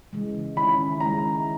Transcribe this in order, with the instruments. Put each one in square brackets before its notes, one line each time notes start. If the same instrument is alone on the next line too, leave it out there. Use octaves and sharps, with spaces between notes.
[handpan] C#3 E3 G#3
[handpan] D#3 G#3 C#4 E4 [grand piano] B5
[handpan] D#3 G#3 C#4 E4 [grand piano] A#5